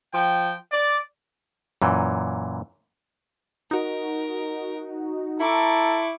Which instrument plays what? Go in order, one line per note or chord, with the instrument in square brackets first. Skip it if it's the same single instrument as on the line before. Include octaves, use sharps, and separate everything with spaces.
[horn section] F3 G5
D5
[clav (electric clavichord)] F#2 A#2 E3
[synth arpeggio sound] D#4 F#4 [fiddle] A#4
[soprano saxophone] E4 [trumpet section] A4 A#5 [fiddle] C#6 D6